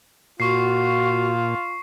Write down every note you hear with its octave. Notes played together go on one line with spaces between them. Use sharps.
A#2 F4 F#4 C#6 C7